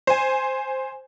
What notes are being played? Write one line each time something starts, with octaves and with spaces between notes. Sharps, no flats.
C5 G#5